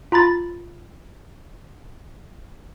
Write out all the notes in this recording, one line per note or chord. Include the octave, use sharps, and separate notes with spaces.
F4 A#5 B5 A6